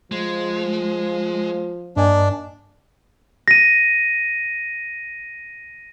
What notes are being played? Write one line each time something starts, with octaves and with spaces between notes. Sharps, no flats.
F3 G#3
G2 A#3 D4 D#5 G#5
A#6 D#7